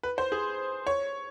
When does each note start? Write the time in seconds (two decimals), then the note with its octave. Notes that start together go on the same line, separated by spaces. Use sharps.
0.03 B4
0.18 C5
0.32 G#4
0.87 C#5